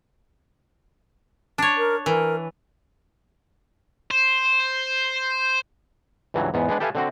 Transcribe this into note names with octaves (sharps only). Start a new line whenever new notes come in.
D4 C#5
A#4
E3 A#4
C5
C#2 G2 E3 F#3
E2 G#2 B3
G#3 B3 D4 B4
G4 A4 B4 E5 F5 G#5
D3 C4 F#4